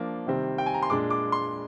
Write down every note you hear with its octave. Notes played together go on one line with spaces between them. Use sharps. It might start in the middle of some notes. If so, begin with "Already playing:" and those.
Already playing: F3 A#3 D4
C3 D#3 G3 C4
G5
G#5
A#5
C6
A#2 G#3 D4 D6
D6
C6